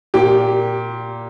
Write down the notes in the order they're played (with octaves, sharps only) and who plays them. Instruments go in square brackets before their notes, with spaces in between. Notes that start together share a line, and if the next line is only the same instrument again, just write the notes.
[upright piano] A#2 G4